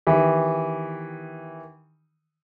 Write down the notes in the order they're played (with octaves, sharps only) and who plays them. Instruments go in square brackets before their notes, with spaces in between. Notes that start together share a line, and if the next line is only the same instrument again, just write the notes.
[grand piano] D#3 E3 B3 D#4 G4